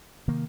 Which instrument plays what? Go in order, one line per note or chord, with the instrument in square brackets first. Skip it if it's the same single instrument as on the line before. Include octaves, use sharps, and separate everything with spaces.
[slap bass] C3 D#3 A#3